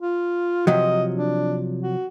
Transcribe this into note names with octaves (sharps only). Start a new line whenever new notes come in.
F4
C3 F3 F#3 D#5
D4
F#4